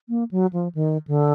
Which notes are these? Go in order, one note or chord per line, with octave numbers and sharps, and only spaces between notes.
A#3
F#3
F3
D#3
D3